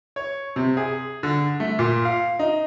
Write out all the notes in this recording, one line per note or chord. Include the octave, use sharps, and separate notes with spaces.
C#5
C3
G#4
D3
A3
A#2
F5
D#4